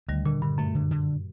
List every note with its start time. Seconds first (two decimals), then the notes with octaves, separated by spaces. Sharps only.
0.08 D2 D#3 G3
0.25 A#2 D3
0.42 G2 D3
0.58 F#2 A3
0.75 D3
0.91 D3